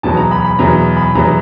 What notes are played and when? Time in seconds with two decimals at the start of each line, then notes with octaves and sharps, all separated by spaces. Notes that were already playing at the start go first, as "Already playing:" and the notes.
0.03 E2 B2 F#3 A5
0.17 A#5
0.31 B5
0.45 B5
0.59 E2 B2 F#3 A#5
0.97 B5
1.15 E2 B2 F#3 A#5